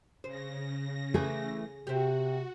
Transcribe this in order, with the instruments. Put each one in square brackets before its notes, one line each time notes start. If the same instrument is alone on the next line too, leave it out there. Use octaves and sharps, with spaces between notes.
[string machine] C#3 A#6 [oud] C5
[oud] E3 A3 [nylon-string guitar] G#4
[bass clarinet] C3 [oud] C4 G4 [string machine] F#4